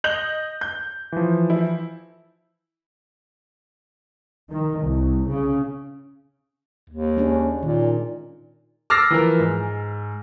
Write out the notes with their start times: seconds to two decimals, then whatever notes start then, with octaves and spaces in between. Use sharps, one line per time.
0.04 D#5 G6 F#7
0.61 G6
1.12 E3 F3
1.50 E4
4.50 D#3
4.80 C2
5.28 C#3
6.90 D#2
7.17 G#3 C#4 D4
7.63 A#2 D#3
8.90 D6 E6 F6 A6 A#6 C7
9.10 E3 F3 A#4
9.39 G#2